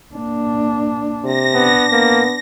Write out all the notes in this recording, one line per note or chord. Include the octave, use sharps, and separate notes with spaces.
A#3 D4
C3 A#6
B3 D4
A#3 B3